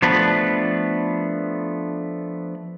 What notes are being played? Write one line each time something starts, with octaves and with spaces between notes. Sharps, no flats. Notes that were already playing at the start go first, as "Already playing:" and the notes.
F3 A3 B3 D4 B4